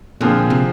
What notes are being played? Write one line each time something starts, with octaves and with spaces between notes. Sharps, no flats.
A#2 D3 F3 C4 F4 G#4
C3